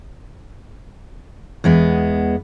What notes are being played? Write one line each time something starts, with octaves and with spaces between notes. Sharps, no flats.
E2 G#3 B3